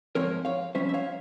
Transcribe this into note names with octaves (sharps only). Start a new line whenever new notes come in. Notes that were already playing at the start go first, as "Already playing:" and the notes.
G#2 F3 C4 A#4 C#5
C#5 F5
F2 C#3 G3 C#4 C5 E5
E5
C#5 F5